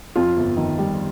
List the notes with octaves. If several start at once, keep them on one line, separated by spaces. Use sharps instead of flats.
F2 F4
G1
D#3
G3